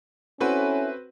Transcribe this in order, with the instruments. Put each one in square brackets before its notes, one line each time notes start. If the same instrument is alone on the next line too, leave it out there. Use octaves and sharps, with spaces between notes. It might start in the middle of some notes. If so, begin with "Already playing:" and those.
[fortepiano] C4 F#4 B4 [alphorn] C#4 [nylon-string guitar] E4 A4